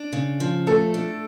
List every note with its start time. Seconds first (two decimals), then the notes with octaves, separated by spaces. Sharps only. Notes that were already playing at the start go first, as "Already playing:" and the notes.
Already playing: D4
0.13 C#3
0.40 F3
0.67 A3 A4
0.94 D4